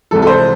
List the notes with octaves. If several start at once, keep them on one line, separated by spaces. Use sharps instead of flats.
C2 C3 E3 G#3 A4
A4
C5